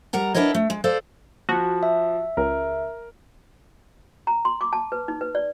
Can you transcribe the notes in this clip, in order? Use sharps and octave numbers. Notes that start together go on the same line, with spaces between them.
G3 A#4 F#5 A#5
D4 E4 A#4 B4 C#5 D#5
A3
G#3
A4 C5 D5 F5
F3 F#4
E5
C#2 A#4
A#5
C6
D6
A5
B4
D#4
B4
D5